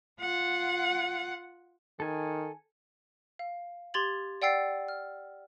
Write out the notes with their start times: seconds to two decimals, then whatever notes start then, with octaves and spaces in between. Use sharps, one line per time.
0.20 F4 F#5
2.00 D#3 A4 G#5
3.39 F5
3.94 G4 C6 G#6 A6 F#7
4.42 D5 F#5 G5 E6 A6 C7
4.88 F6